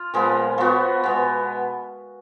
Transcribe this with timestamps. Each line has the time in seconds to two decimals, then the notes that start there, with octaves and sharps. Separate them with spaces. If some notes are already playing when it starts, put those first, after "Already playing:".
Already playing: F4
0.14 A#2 F3 G#3 B3
0.58 F3 B3 F#4
1.04 B2 G#3 B3